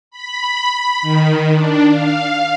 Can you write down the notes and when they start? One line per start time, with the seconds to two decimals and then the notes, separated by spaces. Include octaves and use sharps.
0.11 B5
1.02 D#3
1.51 D4
1.89 F5